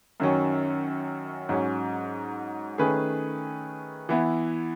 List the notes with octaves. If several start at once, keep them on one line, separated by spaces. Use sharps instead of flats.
F#2 D#3 F#3 C#4
G#2 F#3 C#4
D#3 A3 C#4 G#4 B4
E3 B3 E4